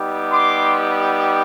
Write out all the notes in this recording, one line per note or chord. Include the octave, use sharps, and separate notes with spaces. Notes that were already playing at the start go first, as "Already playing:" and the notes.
Already playing: G3 B3 D#4 G4
C6 D6